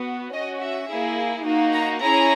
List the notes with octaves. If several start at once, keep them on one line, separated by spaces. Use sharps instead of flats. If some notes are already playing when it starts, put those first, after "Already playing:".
Already playing: B3 F#4
C#4 F#4 D#5
E5
A#3 E4 G#4
A#3 D#4 F#4
A#5
C#4 E4 G#4 A#5